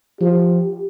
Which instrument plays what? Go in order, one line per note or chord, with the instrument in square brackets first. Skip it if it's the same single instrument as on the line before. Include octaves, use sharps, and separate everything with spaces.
[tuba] F3 [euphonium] G4